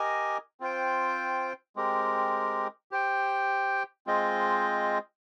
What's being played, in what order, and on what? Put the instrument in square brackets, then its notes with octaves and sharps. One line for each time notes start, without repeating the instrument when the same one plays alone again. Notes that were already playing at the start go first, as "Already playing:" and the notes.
Already playing: [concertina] G4 A#4 D#5 G#5
C4 F4 C5 G5
G#3 C4 G4 A#4
G4 C5 G5
G#3 C4 F4 C5 D#5